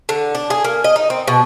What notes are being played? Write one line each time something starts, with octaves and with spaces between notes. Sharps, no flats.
D3
D4
G#4
A#3
D#5
D#4
C4
B2